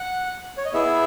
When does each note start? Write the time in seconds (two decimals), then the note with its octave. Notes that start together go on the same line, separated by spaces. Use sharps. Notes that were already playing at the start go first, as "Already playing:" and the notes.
Already playing: F#5
0.58 C#5
0.65 D#5
0.74 B3 E4 G#4 E5